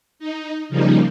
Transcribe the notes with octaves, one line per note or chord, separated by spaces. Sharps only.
D#4
C#3 F3 G3 A#3 D#4